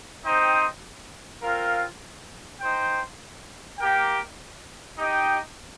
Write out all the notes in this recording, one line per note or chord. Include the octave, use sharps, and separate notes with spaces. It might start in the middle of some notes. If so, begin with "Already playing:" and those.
C4 D#4 C5 D#5 G5
C4 F4 A#4 F5
D#4 C5 G5
A#3 G4 A#4 G5
D#4 G4 D#5 G5